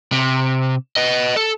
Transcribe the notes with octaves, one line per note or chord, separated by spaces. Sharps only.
C3
B4 D#5
A4